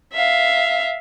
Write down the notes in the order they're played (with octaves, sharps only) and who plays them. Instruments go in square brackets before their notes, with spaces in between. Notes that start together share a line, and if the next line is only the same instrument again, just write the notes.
[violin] E5 F5